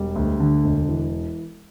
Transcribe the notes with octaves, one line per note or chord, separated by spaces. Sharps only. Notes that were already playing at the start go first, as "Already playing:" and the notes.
Already playing: E1 G3
D2
D3
E1
E3